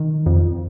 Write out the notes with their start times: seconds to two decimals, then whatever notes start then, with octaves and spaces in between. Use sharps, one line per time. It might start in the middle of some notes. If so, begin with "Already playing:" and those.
Already playing: D#3
0.26 F2